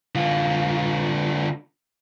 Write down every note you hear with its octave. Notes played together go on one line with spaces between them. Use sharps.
D3 F4